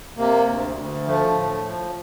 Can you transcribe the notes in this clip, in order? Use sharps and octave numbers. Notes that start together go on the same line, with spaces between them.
C3 A#3
D2
D2
F3 A3
A2
F3